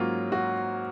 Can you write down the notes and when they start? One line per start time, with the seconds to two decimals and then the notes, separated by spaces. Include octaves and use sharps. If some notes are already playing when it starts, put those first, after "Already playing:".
Already playing: G#2 F#3 A#3 C#4 F4
0.32 F#4